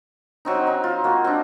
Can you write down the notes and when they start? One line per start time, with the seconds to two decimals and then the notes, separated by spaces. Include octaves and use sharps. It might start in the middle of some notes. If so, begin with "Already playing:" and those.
0.45 F#3 C4 D#4
0.67 D#4
0.84 F4
1.04 A#3 F#4
1.24 C4 D4